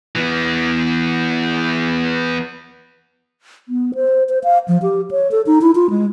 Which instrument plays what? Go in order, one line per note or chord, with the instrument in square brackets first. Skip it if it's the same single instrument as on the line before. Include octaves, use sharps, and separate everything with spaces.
[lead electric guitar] E3 B3
[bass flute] B3
C5
C5
F5
F3
G4
C#5
A4
D#4
E4
F4
G#3